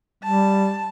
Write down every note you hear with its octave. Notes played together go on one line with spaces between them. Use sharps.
G3 A5